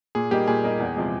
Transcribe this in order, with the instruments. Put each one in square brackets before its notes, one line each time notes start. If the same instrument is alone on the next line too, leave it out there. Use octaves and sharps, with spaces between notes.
[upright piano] A#2 [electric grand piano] G#4
[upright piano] G3 A#3 D#4 [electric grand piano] G4
[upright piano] A#2 [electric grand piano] G#4
[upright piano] G3 A#3 D#4
E2
C3 F3 G#3